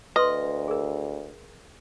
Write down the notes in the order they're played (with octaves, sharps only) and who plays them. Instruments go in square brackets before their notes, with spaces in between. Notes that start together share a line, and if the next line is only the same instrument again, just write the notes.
[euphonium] D2 [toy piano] B4 C6 [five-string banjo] D#5
[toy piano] G#4 A#4